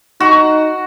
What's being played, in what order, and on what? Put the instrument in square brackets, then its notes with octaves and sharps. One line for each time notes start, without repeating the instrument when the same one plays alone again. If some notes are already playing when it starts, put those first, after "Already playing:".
[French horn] D#4 [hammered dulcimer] F#4